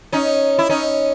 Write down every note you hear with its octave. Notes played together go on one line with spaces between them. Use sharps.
C#4 D#4
E4
C#4 D#4